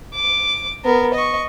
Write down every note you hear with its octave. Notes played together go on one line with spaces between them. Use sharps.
D6
B3 A#4
D#5 C#6